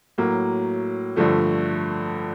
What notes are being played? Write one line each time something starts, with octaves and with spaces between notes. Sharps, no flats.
A2 F#3 A#3
G2 D3 F3 A3